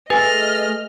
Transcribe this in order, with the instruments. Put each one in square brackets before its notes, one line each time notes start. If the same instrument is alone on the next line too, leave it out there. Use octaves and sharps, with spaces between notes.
[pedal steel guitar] A3 G#4 [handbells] B4 [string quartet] D#5 F6 [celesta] G#5 A6